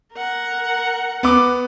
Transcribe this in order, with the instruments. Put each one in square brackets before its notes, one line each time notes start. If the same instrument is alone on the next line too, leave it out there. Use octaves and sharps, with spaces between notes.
[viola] A#4 F#5
[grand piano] B3 D6